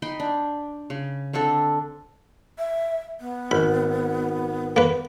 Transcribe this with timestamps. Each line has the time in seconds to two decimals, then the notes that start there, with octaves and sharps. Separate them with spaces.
0.02 D#4 G5 B5 C6
0.20 D4
0.90 C#3
1.33 D3 C4 D4 A4
2.58 E5
3.21 B3
3.51 G#1 B5
4.76 A#3 B4